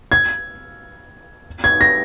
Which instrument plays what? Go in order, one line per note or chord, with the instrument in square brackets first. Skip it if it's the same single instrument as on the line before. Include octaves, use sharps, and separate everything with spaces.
[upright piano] G#6
G#6
A#6